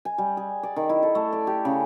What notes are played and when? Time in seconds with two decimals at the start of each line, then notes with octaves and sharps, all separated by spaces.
0.05 G#5
0.18 G3
0.37 G#4
0.63 D5
0.76 D#3
0.89 E4
1.03 A4
1.15 A3
1.32 D5
1.47 G4
1.65 C#3